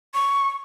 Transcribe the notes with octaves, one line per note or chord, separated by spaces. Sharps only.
C#6